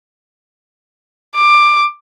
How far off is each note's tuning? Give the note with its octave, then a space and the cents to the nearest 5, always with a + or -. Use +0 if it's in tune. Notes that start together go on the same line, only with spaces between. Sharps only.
D6 +15